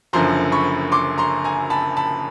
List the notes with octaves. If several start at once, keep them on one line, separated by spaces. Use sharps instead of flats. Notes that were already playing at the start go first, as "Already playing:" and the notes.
F#1 F#2 D3 F3 A#5 C6
B5 C#6
C6 D6
A#5 C6
G#5 A#5
A5 B5
A5 B5